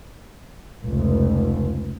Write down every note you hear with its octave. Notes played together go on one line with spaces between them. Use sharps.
F1 C#2